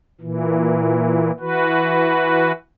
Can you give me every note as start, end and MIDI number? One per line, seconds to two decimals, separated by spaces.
0.21 1.31 46
0.21 1.31 52
1.40 2.52 52
1.40 2.52 66
1.40 2.52 71